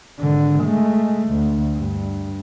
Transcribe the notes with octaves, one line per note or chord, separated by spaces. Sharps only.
G#1 D3
G#3 A3
D2
G2